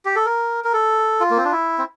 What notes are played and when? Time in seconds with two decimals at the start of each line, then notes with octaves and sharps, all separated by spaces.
0.05 G4
0.16 A4
0.26 A#4
0.64 A#4
0.73 A4
1.20 F4
1.31 A#3
1.37 C4
1.45 D4
1.52 E4
1.78 C4